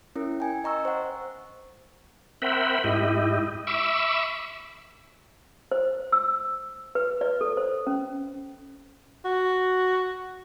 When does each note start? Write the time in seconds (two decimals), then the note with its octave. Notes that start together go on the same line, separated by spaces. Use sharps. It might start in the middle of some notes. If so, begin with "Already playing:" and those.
0.16 C#4 E4 A#4
0.40 G5 G#5
0.64 D#5 A#5 C#6 E6
0.85 C5 F#5
2.42 C4 A#4 E5 F#5 G5 B5
2.84 G#2 E4 G4 D#5
3.67 E5 B5 C#6 D6 E6
5.71 C5
6.12 E6
6.95 B4
7.21 D5
7.41 A4
7.57 C5
7.87 C#4
9.25 F#4